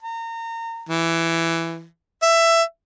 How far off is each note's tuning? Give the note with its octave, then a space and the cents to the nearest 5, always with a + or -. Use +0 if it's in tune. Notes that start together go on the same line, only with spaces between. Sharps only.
A#5 -30
E3 +10
E5 +15